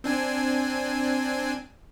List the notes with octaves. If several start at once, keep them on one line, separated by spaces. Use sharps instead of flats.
C4 D4 G#5